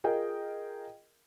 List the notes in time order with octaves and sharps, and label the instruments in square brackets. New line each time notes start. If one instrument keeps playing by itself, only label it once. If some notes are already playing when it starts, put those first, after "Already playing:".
[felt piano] F4 G#4 A#4 D#5 G5